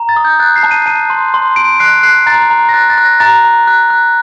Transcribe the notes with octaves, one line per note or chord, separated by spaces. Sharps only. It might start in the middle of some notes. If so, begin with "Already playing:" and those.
Already playing: A#5
A6
D#6
G6
F#6 A6
C7
A5
D#7
A5 D#7
C6
C6
C6 D7
F#6 C7
F#6 C7
A#5 A6
A#5
A#6
F#6 A6
A6
F#6
A#6
A#5 A6
A#5
F#6
F#6